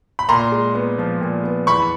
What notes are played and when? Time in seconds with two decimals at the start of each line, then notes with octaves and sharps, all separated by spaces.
0.19 B5
0.29 A#2 A#5 C6
0.52 G#3
0.75 B3
0.98 F3
1.21 A#2
1.44 B3
1.67 E2 B5 C#6